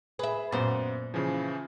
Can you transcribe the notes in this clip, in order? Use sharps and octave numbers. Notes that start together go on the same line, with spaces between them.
G#4 B4 E5
F#2 A#2 B3 C5
C#3 E3 F3